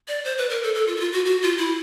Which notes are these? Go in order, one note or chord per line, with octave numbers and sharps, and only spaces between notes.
D5
C5
B4
A#4
A4
A4
F4
F#4
F4
F#4
F#4
F4
E4